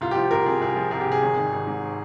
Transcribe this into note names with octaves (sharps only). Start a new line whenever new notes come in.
C2 F4
G4
F3 F4
C2 A#4
C3 G#4
C2 G#4
F3
C2 G#4
G4
C3 G#4
G#1
D#3
G#1
G#2